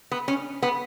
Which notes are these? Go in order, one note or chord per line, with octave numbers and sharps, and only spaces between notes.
B3
C#4
B3